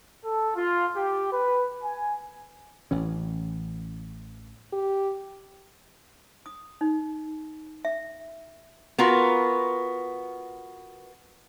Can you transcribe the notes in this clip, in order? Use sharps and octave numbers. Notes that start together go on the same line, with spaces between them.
A4
F4
G4
B4
G#5
A1 E3 C#4
G4
D#6
D#4
E5
B3 F4 F#4 A#4